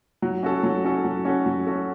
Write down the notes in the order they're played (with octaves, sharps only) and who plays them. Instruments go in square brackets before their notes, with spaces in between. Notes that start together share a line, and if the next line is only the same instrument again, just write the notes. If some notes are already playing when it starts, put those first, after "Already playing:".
[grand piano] F#3
C#4 F#4 A4
F#3
C#4 F#4 A4
F#3
C#4 F#4 A4
F#3
C#4 F#4 A4